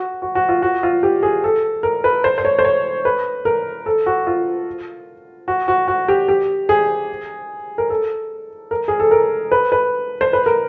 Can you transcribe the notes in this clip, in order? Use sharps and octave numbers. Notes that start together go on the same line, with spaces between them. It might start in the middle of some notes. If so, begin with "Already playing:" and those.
Already playing: F#4
F#4
F#4
F4
F#4
F4
G4
G#4
A4
A#4
B4
C5
C5
C#5
C5
C#5
B4
A#4
A4
F#4
F4
F#4
F#4
F#4
G4
G4
G#4
A#4
A4
A#4
G#4
A4
A#4
B4
B4
C5
B4
A#4